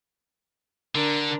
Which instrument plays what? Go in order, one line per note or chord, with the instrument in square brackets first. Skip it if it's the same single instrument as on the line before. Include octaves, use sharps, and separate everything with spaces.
[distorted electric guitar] D3 [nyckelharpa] D4 A#4